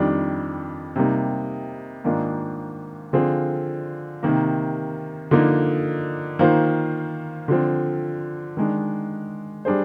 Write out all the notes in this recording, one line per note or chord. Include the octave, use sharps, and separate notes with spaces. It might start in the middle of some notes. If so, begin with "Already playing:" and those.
Already playing: F2 D#3 G3 D4
C3 G3 A#3 D#4
G#2 D#3 A#3 D4 F4
D3 F3 C4 F4 G#4
C3 D#3 A#3
D3 F3 A#3 D#4
D#3 A#3 F4 C5
D3 F3 C4
D#3 G#3 D4
G3 D4 G#4 C5